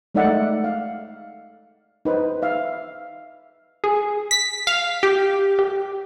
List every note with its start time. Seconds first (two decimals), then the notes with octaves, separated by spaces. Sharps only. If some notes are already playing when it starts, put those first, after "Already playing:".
0.15 G#3 A3 D#4 D5 E5 F#5
0.64 F5
2.05 D#4 B4 C5
2.42 E5 F5
3.84 G#4
4.31 B6
4.67 F5
5.03 G4
5.59 G4